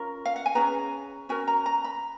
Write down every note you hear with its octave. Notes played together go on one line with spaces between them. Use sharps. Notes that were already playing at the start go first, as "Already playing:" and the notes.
Already playing: C#4 F4 A#4
F5
F#5
G#5
C#4 G#4 B4 A#5
C#4 F#4 A#4 G#5
A#5
A#5
B5